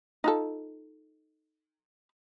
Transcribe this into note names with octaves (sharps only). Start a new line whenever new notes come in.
D#4 F4 A4